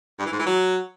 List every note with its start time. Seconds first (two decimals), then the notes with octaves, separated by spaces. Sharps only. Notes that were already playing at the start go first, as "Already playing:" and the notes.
0.19 G2
0.26 E3
0.32 G#2
0.39 E3
0.46 F#3